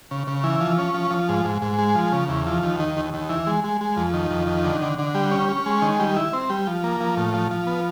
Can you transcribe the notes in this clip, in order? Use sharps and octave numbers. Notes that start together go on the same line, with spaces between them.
C#3
C#3
E3
F3
C#4
F3
F3
G#2
G#2
G#2
G#3
F3
C#3
E2
F3
D#2
D#3
D#2
D#2
E3
G#3
G#3
G#3
F2
D#3
F2
D#3
D3
D3
D3
G3
C#4
C#4
G#3
D#3
G3
E4
C4
G3
F3
A#3
F3
A2
F3
F3
B3